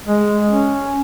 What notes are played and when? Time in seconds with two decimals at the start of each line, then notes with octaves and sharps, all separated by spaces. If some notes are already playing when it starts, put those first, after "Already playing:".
0.07 G#3
0.50 C#4